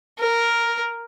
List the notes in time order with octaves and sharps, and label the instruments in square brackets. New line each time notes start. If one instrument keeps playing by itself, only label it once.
[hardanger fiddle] A#4